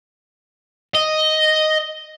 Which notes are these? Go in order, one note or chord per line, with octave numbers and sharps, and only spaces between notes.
D#5